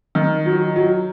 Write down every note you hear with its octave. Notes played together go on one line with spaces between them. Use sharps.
D#3
F#3
F#3